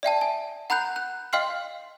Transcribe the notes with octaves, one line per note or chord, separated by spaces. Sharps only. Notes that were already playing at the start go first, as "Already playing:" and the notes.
D5 E5 G5 A5
G#5
F#5 A#5 B5 F#6 G6
F#6
D#5 F5 G5 C6 F6 C7